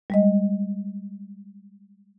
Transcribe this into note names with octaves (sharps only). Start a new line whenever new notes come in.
G3 G#3 D#5